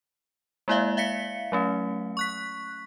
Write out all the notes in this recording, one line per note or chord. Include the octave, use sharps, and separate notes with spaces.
G#3 A#3 E4 D5 E5 F5
E5 F5 B6 C#7
F#3 A3 C#4
C#6 F#6 B6